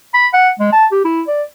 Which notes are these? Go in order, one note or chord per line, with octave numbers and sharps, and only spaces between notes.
B5
F#5
G#3
A5
G4
E4
D5